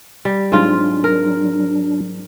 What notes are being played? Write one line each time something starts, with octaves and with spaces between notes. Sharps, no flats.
G3
G#2 F#3 C4 D4 F4
A#4